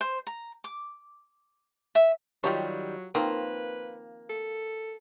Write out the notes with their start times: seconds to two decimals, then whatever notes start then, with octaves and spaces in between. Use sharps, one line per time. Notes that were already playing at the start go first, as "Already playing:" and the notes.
0.01 C5
0.27 A#5
0.64 D6
1.95 E5
2.44 D#3 F#3 G3 F4 G4 C#5
3.15 D#3 F3 A#3 C4 B4
4.30 A4